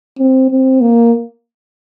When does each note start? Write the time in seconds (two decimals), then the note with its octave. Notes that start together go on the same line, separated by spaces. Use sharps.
0.19 C4
0.51 C4
0.81 A#3